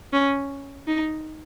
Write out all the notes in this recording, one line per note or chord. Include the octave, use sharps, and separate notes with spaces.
C#4
D#4